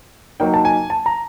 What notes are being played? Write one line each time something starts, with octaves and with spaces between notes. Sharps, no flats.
F#3 A#3 D#4 G5
A5
G#5
A5
A#5